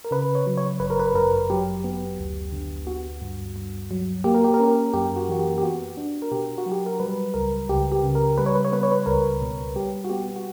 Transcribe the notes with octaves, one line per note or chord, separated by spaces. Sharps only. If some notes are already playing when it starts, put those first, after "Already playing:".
A#4
C#3 B4
C#5
F#3
C#5
G1 B4
A#4
B4
F#2 A#4
F#3 G4
B3
D2
D3
B3 F#4
G2
G2
F#3
A#3 G4
A#4
G4
A#4
C#4 G4
F#2 G4
F#4
E3 F#4
G4
G4
B3 F#4
D4
A#4
B2 G4
F#4
F#3
G4
A#4
G3 B4
C#2 A#4
C#2 G4
G4
C#3
A#4
G3 B4
C#5
B4
C#5
B3 B4
C#5
B4
C#2 A#4
B2
G3 G4
F#4
B3 G4
F#4